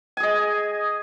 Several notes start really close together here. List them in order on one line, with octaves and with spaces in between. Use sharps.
G#5 G#4 D#5